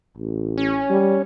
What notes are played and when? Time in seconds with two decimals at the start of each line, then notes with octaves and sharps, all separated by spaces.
0.17 A1
0.58 C#4
0.90 G3